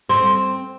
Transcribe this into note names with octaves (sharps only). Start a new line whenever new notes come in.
C4